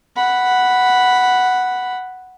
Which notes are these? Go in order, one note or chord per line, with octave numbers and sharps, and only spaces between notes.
F#5 B5